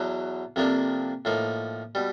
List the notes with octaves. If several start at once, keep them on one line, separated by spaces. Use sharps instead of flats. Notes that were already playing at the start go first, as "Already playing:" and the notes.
Already playing: E2 B2 F#3
F2 C3 F3 A#3 D4
A2 F3 A#3 D#4
B2 G3